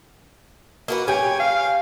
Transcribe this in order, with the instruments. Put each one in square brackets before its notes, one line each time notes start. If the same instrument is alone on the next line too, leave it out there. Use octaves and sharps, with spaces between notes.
[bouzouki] A#3 F#4 B4
[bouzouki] C#4 [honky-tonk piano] G4 G5 [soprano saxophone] G#5
[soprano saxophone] F5